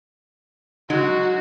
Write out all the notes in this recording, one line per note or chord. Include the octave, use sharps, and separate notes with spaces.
F#3 G#3 D#4 F#4